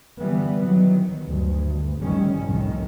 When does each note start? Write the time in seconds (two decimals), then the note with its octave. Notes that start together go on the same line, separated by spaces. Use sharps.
0.20 D3 E3 G3 B3
0.65 D#3 F#3
1.27 D2 G2
2.01 G1 A2 D#3 G3 C#4
2.48 C2 F2 A2 D#3